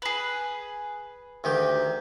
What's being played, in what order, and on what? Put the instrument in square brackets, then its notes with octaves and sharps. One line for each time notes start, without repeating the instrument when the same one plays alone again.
[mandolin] G#4 B4
[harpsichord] D2 D#3 G4